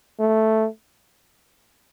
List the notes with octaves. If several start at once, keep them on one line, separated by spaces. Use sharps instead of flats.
A3